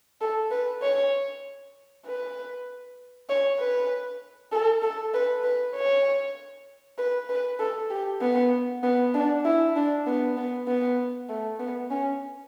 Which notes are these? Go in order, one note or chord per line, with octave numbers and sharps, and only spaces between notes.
A4
B4
C#5
B4
C#5
B4
A4
A4
B4
B4
C#5
B4
B4
A4
G4
B3
B3
D4
E4
D4
B3
B3
B3
A3
B3
C#4